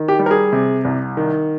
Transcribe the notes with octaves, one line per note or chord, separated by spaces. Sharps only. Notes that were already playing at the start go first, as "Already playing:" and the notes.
Already playing: D#3
G4
G3
A#4
G#4
C3
C2
D#3